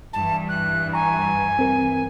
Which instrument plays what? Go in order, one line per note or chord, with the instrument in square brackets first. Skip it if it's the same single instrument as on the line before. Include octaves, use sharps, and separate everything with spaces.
[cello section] G2 E3 [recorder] A5
[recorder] F#6
[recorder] G#5 [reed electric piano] A#5 C#6
[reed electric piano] C4 A#4